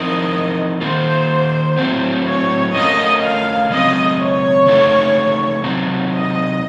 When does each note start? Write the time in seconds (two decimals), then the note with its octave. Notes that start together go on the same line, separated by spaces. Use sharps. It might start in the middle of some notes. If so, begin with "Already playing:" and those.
Already playing: F3 C4 D#4 A#4 D#5
0.80 D#3 A#3 F4 C5
1.77 A2 F#3 C4
2.26 C#5
2.73 A3 C#4 F4 A#4 D#5
3.22 F5
3.70 C#3 F#3 C4 D#5
4.19 C#5
4.66 C#3 A3 D#4 A4
5.64 C3 F#3 C4 D#4
6.12 D#5